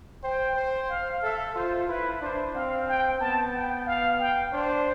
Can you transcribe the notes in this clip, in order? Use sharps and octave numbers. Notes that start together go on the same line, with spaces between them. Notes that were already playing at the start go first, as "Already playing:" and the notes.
C5 G5
C5
F5
A4 E5
F4 C5
E4 B4
D4 C5
C4 F5
G5
B3 A5
G5
F5
G5
D4 C5